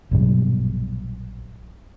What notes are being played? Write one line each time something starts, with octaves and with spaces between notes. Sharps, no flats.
A#1 G2 B2 F#3